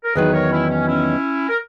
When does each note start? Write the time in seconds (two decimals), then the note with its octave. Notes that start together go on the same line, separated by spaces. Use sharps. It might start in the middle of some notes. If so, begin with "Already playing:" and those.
0.04 A#4
0.15 E2 D#3 F#3 G#4 B4
0.33 A#4 C#5
0.51 C#4 E4
0.69 C#4
0.87 C#4 E4
1.49 A#4